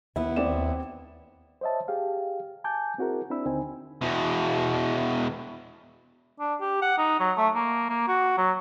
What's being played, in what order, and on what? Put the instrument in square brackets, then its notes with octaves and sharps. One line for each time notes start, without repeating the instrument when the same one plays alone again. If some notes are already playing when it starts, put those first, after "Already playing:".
[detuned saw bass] D#2 [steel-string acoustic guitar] B3 E4
[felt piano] C4 D5 E7
[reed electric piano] C5 C#5 D#5 E5 A5
G4 G#4 F5
G#5 A5 D6 G6
C4 E4 F#4 G#4 A#4
C4 D4 E4 B5 E6
D#2 D3 C4 D#4 G#5
[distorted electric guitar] E2 B2
[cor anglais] D4
G4
F#5
D#4
F#3
A3
A#3
A#3
F#4
F#3